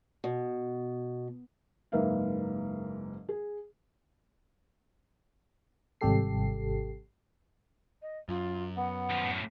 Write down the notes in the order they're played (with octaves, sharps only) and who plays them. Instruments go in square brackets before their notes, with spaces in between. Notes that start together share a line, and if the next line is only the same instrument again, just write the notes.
[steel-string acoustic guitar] B2
[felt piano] F#1 G#2 A#3 B4 E5 F5
G#4
[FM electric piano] G#1 C3 G3 G4 A4 C7
[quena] D#5
[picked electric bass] F#2 [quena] F4
[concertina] B3 [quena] F#5
[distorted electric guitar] D#2 F3
E2 A2